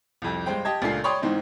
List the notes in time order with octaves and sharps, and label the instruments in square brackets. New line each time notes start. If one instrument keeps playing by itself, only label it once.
[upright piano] C2 F2
G2 G#3 C5 G5
G4 D#5 A5 G#6
C#2 A#2 A3 D4 F4 C7
C#5 D5 G5 B5 C6 D#6
G#2 E3 C4 D#4